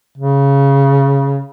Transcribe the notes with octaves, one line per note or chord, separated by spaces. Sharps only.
C#3